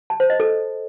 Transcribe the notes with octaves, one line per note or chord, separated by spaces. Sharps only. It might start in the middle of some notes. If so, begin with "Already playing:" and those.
A5
C5
D#5
A4